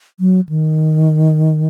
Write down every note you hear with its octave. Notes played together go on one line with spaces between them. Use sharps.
F#3
D#3